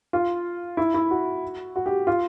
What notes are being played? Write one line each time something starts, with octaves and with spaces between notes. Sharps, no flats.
F4
E4
E4
F#4
F#4
G4
F4